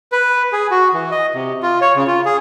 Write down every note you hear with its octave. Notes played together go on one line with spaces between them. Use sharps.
B4
G#4
F#4
E3
D#5
C3
F4
C#5
C#3
F4
G#4